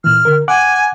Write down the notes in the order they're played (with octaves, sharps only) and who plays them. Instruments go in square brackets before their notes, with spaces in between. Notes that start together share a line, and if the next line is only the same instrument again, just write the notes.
[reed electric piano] A#2 E3 [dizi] F6
[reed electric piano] D3 A#4
[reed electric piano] F#5 D6 F#6 [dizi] G#5